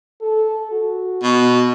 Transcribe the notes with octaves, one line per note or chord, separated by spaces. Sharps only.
A4
F#4
B2